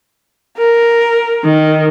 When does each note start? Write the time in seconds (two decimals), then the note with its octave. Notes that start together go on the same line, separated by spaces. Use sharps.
0.58 A#4
1.44 D#3